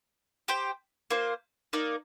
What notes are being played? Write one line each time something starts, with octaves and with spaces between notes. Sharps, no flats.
G4 C5 G5
A#3 F4 C5
A#3 D#4 A#4 D5